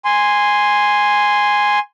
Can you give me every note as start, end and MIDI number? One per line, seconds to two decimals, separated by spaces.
0.05 1.79 80
0.05 1.79 84